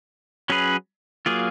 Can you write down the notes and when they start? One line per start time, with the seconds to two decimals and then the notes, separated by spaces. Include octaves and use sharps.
0.50 F#3 C#4 G#4 B4
1.26 F#3 A#3 F4 G#4